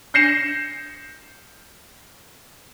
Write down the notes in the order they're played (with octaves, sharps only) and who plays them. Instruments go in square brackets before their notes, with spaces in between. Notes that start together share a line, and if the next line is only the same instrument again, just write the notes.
[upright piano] G6 A#6 C7 C#7 E7